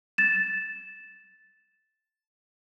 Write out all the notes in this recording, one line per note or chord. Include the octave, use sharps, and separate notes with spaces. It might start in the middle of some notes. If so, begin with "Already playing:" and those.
A6 E7